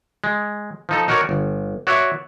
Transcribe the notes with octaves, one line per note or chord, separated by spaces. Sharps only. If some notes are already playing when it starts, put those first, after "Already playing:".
G#3
F3 D#4 A4
D#4 F#4 A#4 C#5 D5
G1
F#4 C#5 D5 E5 F#5